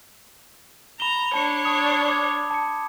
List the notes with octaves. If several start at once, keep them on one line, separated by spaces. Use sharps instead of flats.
A#5 B5 E7 G7
D4 C#5 A5 C#7
A5 D#6
D6 G#6
A5 C#7